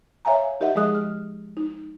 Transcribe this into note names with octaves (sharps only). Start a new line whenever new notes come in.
C#5 E5 F5 G#5 A#5
D#4 G4 A#4 D#5 E5 F#5
F3 G#3 G#4 D#5 D#6 F#6
F6
D#4